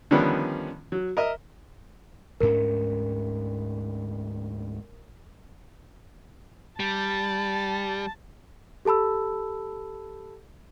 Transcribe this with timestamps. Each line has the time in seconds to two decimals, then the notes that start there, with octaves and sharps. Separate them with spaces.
0.11 D3 D#3 F3 G3 B3 C#4
0.92 F#3
1.17 A#4 D#5 E5
2.40 D2 G#2 C#4 A#4
6.80 G3 A5
8.85 G4 A4 A5 B5 E6